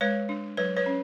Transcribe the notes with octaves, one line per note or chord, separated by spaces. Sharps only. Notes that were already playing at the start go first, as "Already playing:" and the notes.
G#3 B4 C#5
D4
F#3 B4 C#5
B4 C#5
C#4